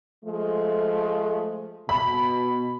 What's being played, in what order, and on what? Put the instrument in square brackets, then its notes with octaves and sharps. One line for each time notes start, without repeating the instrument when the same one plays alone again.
[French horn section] F3 G#3 A3
[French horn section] B2 [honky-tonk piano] B5